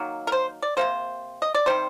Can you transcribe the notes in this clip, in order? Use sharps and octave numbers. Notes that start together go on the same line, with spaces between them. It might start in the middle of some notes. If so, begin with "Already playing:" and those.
Already playing: D#3 F#3 A#3
A#4
C5
D5
C3 G3 A#3 C5
D#5
D5
C3 D#3 G3 C5